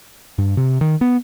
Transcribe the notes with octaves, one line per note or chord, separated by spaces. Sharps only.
G2
C3
D#3
B3